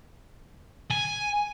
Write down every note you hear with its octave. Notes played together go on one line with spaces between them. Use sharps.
G#5